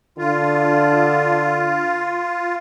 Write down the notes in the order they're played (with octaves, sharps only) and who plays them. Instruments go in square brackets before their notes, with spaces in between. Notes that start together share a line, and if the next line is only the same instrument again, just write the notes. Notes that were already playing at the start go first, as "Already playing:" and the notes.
[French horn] D3 [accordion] F4